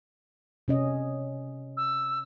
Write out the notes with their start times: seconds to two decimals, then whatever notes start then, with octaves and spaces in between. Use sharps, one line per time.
0.68 C3 C#4 D#5
1.77 E6